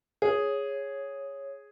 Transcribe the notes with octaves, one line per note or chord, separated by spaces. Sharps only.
G#4 C#5